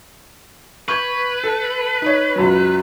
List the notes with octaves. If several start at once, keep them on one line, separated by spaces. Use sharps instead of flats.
B4 C#6 G6 G#6
A4
D#4 C#5
C#2 F#2 F#3